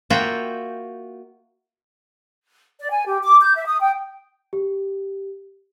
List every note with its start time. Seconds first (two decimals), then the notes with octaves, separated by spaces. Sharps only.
0.10 A#3 F4 F#4 E5 G5
2.79 D5
2.91 G#5
3.08 G4
3.23 D6
3.41 G6
3.55 E5
3.68 D#6
3.81 G5
4.53 G4